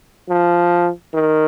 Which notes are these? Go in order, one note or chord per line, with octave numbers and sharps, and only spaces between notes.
F3
D#3